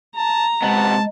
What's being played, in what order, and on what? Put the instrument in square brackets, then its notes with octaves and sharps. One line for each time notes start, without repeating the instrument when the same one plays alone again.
[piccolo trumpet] A5 [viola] A#5
[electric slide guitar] C3 B3 [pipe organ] G#3 [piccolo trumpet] A5